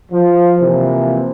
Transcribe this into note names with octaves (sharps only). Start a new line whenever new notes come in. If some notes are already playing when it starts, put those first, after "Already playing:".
F3
C3 E3 F3 A#3